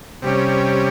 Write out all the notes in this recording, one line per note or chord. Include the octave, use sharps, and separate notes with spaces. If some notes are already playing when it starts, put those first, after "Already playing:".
C3 G3 C#4